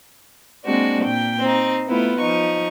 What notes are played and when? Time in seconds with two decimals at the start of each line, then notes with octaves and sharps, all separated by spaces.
0.64 G#3 A#3 C4 D4 F#4
1.03 A#2 G5
1.40 C4 D#4
1.88 A3 B3 E4 F4
2.19 F3 D#4 C#6